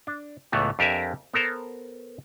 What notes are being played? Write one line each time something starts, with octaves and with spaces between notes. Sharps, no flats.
D4
C#2 A2 E3 A3 B3
F2 D4 G4 A#4 E5 G#5
B3 A4 A#4 C5